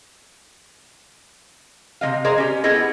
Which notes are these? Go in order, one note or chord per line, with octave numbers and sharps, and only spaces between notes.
C3 A3 D#5 F5
G#4 A#4 C5 D5 D#5 A#5
C#4 G4
B3 C#4 E4 G#4 A4 D#5